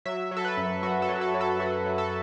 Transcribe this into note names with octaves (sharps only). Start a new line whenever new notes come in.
F#3 E5
F#3
A4
B4
F#2
F#2 F#4
A4
F#3
A4
F#3
A4
F#3 F#4
F#3
A4